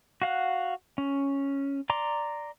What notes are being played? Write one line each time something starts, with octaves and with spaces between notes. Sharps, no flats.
F#4 F5 F#5
C#4
D5 A#5 C6 D6